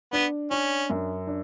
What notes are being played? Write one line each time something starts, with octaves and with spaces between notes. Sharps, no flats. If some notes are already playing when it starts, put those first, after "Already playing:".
B3 D4
C#4 D4
F#2
D4